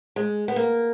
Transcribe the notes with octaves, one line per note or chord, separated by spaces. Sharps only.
G#3
B3
A#3